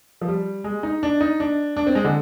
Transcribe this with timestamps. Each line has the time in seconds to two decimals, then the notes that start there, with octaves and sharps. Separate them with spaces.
0.21 F3
0.28 G3
0.64 G#3
0.83 D#4
1.03 D4
1.21 D#4
1.40 D4
1.77 D4
1.87 C4
1.95 G#3
2.05 D3